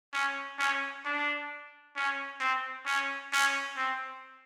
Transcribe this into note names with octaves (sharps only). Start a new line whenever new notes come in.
C#4
C#4
D4
C#4
C4
C#4
C#4
C4